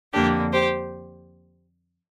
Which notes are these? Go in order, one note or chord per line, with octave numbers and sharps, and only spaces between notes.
F2 D3 A#3 D4 G4
G4 C5